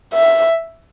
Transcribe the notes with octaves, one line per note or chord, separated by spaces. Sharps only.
E5